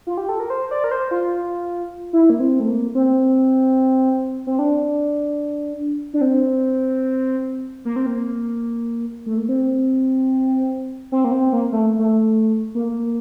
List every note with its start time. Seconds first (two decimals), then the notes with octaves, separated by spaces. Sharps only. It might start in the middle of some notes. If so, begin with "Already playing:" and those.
0.07 F4
0.17 G4
0.29 A4
0.40 A#4
0.50 C5
0.71 D5
0.84 A#4
0.91 C5
1.11 F4
2.13 E4
2.30 A#3
2.40 C4
2.60 A3
2.68 A#3
2.95 C4
4.47 C4
4.59 D4
6.14 D4
6.21 C4
7.85 A#3
7.96 C4
8.06 A#3
9.26 A3
9.37 A#3
9.49 C4
11.12 C4
11.24 A#3
11.31 C4
11.53 A#3
11.72 A3
11.99 A3
12.75 A#3